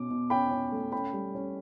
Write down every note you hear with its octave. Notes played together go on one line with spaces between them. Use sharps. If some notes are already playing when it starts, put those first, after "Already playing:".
Already playing: B2 C#4 D6
B2
C#4 G5 B5
C#4
A3
C#4 G5 B5
G3
C#4